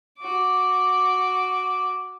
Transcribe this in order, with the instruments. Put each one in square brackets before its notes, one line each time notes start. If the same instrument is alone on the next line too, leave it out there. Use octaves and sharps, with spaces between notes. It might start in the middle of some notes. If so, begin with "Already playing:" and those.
[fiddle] F#4 D6